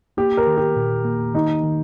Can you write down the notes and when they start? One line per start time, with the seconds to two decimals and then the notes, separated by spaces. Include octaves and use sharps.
0.17 A#3 G4
0.37 A#4
0.47 D#3
0.57 G4
0.76 A#2
1.05 A#3
1.34 D#3 D#4
1.63 D#3